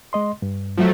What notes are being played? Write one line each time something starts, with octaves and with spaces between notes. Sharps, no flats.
G#3 D#5 C6
G2
F3 F#3 A3